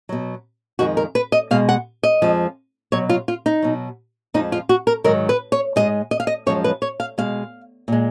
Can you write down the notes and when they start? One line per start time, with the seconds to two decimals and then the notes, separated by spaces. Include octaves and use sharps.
0.09 B2 F#3
0.79 F2 D#3 G#3 F#4
0.97 A#4
1.15 B4
1.32 D#5
1.51 B2 G#3 F5
1.69 F#5
2.03 D#5
2.22 F2 F3 G#3
2.92 B2 F#3 C#5
3.09 F4
3.28 F4
3.46 D#4
3.62 B2 F#3
4.34 F2 F3 G#3 D#4
4.52 F4
4.69 F#4
4.87 A#4
5.04 G#2 D#3 F#3 A#4
5.29 B4
5.52 C#5
5.76 G#2 F3 G#3 D#5
6.11 D#5
6.20 F5
6.27 D#5
6.46 F#2 F3 G#3 C#5
6.64 B4
6.82 C#5
7.00 F5
7.18 B2 G#3 F5
7.88 A#2 G#3